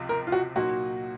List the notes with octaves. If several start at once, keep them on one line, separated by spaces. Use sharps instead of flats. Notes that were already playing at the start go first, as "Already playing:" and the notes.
Already playing: C#2 C3 F3 C4
A#4
F4
F#4
A#2 F#3 A#3 D#4 F#4